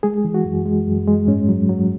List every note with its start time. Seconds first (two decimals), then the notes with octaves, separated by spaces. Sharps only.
0.03 G#3 G#4
0.25 E3
0.34 F#4
0.45 F#2
0.66 G#3
0.87 F#2
1.08 G#3
1.28 G#2 C#4
1.49 F#3
1.69 F#3